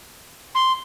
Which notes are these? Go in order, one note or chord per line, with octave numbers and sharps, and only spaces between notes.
C6